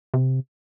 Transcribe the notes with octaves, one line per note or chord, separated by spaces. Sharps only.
C3